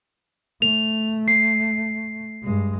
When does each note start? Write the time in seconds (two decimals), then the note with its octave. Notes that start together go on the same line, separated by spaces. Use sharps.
0.62 A3 F7
1.28 C7
2.43 G2 G#3